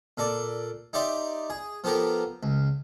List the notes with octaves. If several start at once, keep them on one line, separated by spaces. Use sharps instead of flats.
A#2 A4 D5
D#4 G4 D5 E5 C6
G#4
F3 B3 G4 A4 A#4
C#2